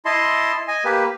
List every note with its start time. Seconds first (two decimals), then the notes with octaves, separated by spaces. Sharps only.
0.05 E4 D#5 A5 C6
0.68 D#5 G#5
0.84 A#3 G4 B4